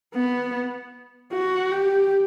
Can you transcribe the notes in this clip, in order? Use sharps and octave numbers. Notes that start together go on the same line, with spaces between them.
B3
F#4
G4